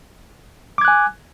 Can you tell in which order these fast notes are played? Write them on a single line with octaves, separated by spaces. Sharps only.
D6 G#6 F#6 G#5